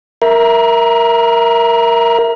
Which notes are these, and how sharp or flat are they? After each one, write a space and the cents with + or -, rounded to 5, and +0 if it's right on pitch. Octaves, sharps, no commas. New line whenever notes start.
A#4 +0 E5 +0 A#5 +40